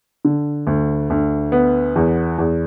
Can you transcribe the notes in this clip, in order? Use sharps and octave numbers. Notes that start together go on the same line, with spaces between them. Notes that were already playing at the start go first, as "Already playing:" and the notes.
D3
D2
D2
B3
E2
E2